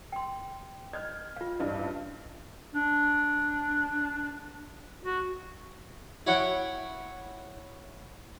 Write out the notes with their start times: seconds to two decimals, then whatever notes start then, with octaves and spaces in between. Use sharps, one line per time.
0.12 G5 C6
0.93 D#5 F6 G6 G#6
1.36 F4 F5
1.60 A1 G2 D4 D#5
2.74 D4
5.05 F#4
6.27 E4 F#4 C#5 F#5 G5